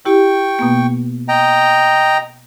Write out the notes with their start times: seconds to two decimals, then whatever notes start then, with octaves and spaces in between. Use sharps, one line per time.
0.05 E4 G4 G5 C#6
0.59 B2 A#3 B3
1.28 D#5 G5 A#5